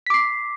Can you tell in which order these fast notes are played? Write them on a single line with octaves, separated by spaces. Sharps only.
B6 D6 C7